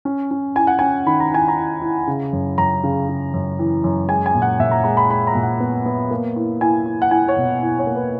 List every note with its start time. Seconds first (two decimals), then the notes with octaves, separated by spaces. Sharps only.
0.05 C#4
0.31 C#4
0.56 E4 G#5
0.67 F#5
0.79 C#4 G#5
1.06 D#3 B5
1.20 A#5
1.32 E4 G#5
1.48 A#5
1.56 E4
1.82 E4
2.07 C#3
2.32 F#2
2.58 F#2 A#5
2.83 C#3
3.09 C#3
3.34 F#2
3.59 E3
3.84 F#2
4.08 G#3 G#5
4.26 G#5
4.35 A#2
4.42 F#5
4.60 A#2 E5
4.71 A#5
4.84 G#3 A#5
4.97 B5
5.10 G#3 B5
5.27 A#5
5.35 A#2
5.43 F#5
5.60 B3
5.86 B3
6.11 A#3
6.36 E4
6.61 E4 G#5
6.86 E4
7.02 F#5
7.11 E4 G#5
7.28 C#5
7.36 B2
7.62 E4
7.79 C#5
7.87 A#3
7.96 B4